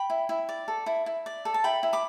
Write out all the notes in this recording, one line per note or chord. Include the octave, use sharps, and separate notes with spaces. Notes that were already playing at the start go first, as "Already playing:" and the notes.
Already playing: G5 B5
E4
E4
D5
A4
E4
E4
D5
A4
A5
E4 G5 B5
E4
B5 D6